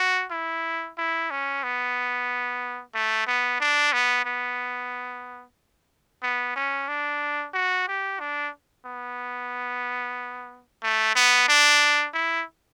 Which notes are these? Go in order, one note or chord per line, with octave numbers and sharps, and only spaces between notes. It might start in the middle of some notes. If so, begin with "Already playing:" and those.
Already playing: F#4
E4
E4
C#4
B3
A3
B3
D4
B3
B3
B3
C#4
D4
F#4
G4
D4
B3
A3
B3
D4
E4